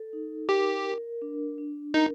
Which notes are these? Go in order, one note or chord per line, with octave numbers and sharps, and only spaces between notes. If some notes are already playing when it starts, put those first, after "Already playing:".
Already playing: A4
D#4
G4 A#4
A#4
D4
D4
D#4 A#4